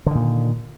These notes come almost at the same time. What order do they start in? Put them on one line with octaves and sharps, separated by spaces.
D3 D#3 A#2